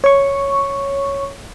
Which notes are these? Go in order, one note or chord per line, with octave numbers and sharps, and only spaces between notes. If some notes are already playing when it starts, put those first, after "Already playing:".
C#5 C#6